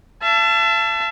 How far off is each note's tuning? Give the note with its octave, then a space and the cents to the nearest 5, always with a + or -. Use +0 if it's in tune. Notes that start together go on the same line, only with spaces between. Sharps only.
E5 +45 A5 +0